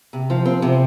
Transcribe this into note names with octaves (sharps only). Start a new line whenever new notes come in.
C3
F3
C4
C3